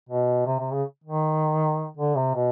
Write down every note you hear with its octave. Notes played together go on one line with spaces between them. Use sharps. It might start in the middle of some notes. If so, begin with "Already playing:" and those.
B2
C3
C3
C#3
D#3
D3
C3
B2